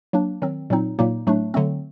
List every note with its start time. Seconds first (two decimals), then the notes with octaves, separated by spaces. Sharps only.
0.13 F#3 A#3 D4
0.42 D#3 F#3 C4
0.70 A#2 F#3 C4 D#4
0.99 A#2 F#3 A#3 D#4
1.27 A2 F#3 A3 D4
1.54 D3 F#3 A3 C4